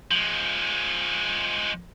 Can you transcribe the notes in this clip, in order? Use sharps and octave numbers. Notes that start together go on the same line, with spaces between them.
F3 G#3